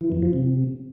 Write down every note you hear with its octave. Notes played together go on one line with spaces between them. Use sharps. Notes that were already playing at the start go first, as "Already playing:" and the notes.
E3
F2
F3
C3